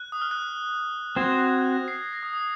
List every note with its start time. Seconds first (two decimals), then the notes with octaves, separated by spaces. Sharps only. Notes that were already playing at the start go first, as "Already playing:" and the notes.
Already playing: F#6
0.12 D#6
0.22 F6
0.31 F#6
1.16 C4 F#4 C5 G#6
1.59 F#6
1.73 A#6
1.88 C7
2.01 A#6
2.13 A#6
2.23 D#6
2.33 D#6